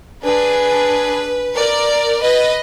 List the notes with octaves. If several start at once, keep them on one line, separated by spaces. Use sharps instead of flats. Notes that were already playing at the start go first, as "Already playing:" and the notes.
D4 G#4 B4
A#4 D5
B4 D#5